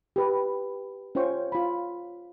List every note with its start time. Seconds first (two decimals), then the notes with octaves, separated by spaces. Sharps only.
0.16 G4 B4
1.15 C#4 F4 C5 G5 C#6
1.52 F4 B5